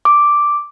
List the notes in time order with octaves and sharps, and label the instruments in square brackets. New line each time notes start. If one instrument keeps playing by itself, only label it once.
[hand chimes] D6